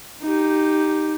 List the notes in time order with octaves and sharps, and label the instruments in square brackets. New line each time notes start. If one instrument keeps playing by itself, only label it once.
[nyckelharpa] D#4 G4